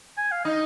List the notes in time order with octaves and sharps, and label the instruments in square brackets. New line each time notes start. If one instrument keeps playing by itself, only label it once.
[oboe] G#5
F5
[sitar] D#4 [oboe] D#5